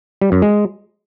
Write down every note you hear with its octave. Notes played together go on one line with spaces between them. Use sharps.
G3
F#2
G#3